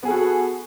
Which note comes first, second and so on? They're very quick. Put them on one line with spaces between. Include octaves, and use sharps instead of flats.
B3 G#4 A4 F#4